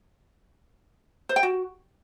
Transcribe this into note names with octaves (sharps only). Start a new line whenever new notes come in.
C5
G5
F#4